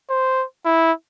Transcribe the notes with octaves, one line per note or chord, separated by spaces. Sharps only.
C5
E4